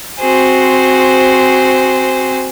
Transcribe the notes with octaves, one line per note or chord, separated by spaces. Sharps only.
C4 F#4 G#4 C5